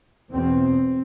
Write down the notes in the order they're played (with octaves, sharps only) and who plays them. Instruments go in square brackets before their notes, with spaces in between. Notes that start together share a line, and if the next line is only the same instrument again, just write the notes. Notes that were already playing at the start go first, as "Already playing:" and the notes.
[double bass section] E2 B2 C4